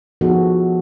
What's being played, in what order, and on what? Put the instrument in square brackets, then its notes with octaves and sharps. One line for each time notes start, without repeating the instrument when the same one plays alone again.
[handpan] F3 B3 D#4 F#4 G#4 A4